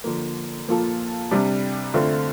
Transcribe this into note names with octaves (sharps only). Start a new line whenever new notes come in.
D3 F3 A#3
A#2 F3 A#3 F4 A4
C3 G3 D4
D3 A3 C4 F4